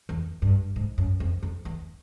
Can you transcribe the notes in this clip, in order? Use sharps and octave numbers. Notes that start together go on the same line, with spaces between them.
E2
G2
G#2
F#2
F2
F2
E2